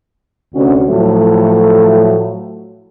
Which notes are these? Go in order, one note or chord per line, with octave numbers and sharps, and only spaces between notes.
D2 C3 C#4 F#4
A2 F3 F#3 A3